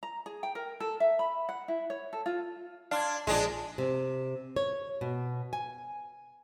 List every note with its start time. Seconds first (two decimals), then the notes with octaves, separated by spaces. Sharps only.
0.03 A#5
0.26 G#4
0.43 G5
0.55 A#4
0.80 A4
1.00 E5
1.19 B5
1.49 F#5
1.68 E4
1.90 C#5
2.13 A4
2.26 F4
2.91 D4 F5 C6 G#6
3.27 A#1 A#2 F3 G#3 D4
3.78 C3
4.56 C#5
5.01 B2
5.53 G#5